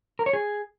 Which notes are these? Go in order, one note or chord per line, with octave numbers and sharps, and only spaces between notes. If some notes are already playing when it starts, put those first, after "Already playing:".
A#4
C#5
G#4